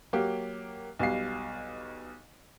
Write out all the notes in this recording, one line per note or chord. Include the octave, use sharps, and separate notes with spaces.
F#3 A#3 G4
B1 B2 G3 F5 C7